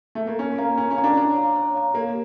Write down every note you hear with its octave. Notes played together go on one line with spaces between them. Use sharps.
A3
A#3
C#4 C#5
A#3 F5 A#5
C#4 C#5
C#4
F5 A#5
D4
D4 C#5
F5 A#5
C#5
F5 A#5
A#3 G4